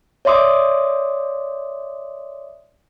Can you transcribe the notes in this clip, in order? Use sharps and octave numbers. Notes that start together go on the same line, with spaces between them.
C#5 D5 E5 C6 D6 D#6